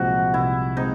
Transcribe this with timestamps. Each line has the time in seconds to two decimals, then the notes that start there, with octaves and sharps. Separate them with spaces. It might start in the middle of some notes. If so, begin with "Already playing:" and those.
Already playing: C2 A#2 F3 G#3 C4 D#4 F#4
0.34 C2 E4
0.77 F3 G#3 C4 D#4